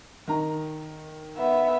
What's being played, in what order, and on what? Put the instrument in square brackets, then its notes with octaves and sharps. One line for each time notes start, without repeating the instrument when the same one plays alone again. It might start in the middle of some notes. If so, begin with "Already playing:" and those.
[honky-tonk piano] D#3 A#5
[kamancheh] B3 E5